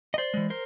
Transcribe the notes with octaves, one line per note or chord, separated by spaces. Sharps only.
D#5
C5 D5
E3 G#3
A#4 C5